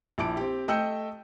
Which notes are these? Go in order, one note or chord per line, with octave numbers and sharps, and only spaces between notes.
A#1 E4 A5 D6 D7
C4 G4
A3 D#5 G5 E6 G6 C#7